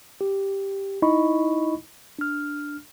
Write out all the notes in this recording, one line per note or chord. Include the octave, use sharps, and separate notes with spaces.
G4
D#4 E4 D#5 B5 C#6
D4 F6